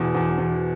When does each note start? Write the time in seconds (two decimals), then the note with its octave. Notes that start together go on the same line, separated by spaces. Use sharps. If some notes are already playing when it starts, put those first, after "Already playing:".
Already playing: E2 B2
0.14 E2
0.38 E2